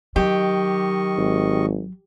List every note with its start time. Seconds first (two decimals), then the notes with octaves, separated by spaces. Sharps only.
0.16 D#3 F#3 G4 D#5 C#6
1.17 G#1